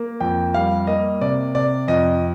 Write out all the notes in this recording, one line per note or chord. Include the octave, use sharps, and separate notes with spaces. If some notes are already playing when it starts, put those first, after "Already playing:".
Already playing: A#3
F2 G5
G3 F5
A#3 D#5
C3 D5
C3 D5
F2 D#5